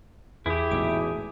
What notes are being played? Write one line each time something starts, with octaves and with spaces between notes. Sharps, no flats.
E2 E4 G4 G#4
A1 G#2 B2 E5 D6